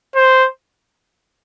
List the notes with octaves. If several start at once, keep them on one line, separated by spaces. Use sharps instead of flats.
C5